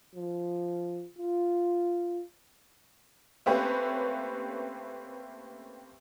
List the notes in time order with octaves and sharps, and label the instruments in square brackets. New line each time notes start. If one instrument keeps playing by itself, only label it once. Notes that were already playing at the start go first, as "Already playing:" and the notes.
[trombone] F3
F4
[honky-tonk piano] A3 A#3 C4 C#4 G4 B4